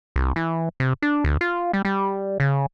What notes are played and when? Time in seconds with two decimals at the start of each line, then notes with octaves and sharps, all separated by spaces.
0.16 C2
0.36 E3
0.80 C3
1.02 D4
1.24 D2
1.41 F4
1.73 G3
1.85 G3
2.40 C#3